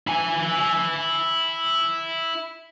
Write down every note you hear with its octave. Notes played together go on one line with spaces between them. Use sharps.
E4 G#5